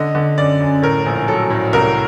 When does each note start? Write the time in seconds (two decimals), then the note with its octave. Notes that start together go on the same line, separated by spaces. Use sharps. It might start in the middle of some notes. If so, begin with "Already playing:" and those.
Already playing: D3 D#5
0.15 D3
0.38 F#2 D5
0.60 F#2
0.82 A2 A#4
1.06 A#1
1.28 F#3 A4
1.50 A2
1.73 C2 A#4